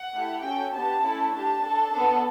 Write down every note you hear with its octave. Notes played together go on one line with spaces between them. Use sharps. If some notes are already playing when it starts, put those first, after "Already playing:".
Already playing: F#5
A3 E4 G4
C#4 F#4 A4 G5
B3 D4 G4 A5
A3 C#4 E4 A4
D4 G4 A5
D4 A4
B3 D4 A4